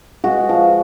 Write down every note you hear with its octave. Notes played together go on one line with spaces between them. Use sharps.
G#3 F#4
F3